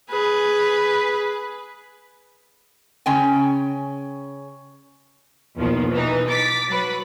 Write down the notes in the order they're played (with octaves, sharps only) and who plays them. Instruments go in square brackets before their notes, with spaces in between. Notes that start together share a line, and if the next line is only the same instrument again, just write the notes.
[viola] G#4 B4
[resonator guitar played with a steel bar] C#3 C#4 G5 G#5
[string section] B1 E2 A#2 D#3 F3
E3 D#4
D6 A6 B6
F#3 B4